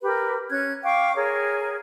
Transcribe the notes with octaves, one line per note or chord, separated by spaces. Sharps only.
G4 A#4 B4
C#4 F#6 G#6
F5 G5 C#6 D6
G#4 A#4 C#5